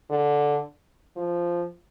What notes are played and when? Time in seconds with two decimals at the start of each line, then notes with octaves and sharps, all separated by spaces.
0.10 D3
1.16 F3